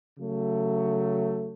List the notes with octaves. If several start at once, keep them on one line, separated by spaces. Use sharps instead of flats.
C#3 F#3 A3